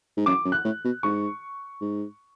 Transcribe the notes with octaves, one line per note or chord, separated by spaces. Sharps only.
G#2
F#2 D6
F#2
F#6
A2
B2
G#2 C#6
G#2